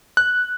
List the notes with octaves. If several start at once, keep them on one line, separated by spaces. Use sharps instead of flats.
F#6